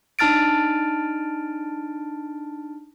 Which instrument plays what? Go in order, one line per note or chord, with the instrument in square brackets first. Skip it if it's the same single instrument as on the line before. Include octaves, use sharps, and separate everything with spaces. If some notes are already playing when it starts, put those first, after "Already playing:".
[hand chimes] D4 D#4 A5 F6 A6 D7